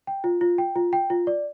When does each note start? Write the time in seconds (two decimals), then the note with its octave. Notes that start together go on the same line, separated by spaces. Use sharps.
0.07 G5
0.24 F4
0.41 F4
0.58 G5
0.76 F4
0.93 G5
1.10 F4
1.27 D5